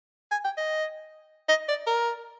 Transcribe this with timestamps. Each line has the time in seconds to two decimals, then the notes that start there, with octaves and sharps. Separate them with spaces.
0.31 G#5
0.44 G5
0.57 D#5
1.49 D#5
1.68 D5
1.87 A#4